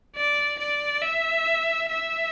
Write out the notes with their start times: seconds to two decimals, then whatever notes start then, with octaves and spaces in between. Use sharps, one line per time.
0.16 D5
0.59 D5
1.02 E5
1.89 E5